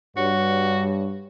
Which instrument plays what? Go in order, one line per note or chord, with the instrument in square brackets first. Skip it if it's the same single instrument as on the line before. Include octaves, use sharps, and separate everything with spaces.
[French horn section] G2 [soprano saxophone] F#4 [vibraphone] C#5